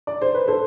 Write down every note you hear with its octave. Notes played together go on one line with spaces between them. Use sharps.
D5
C5
B4
A4 C5